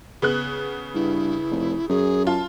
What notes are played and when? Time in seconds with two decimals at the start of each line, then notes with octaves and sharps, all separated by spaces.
0.22 C#3 B3 F#6
0.94 G2 E4
1.51 F1
1.89 F#2 G#4
2.27 F4 A5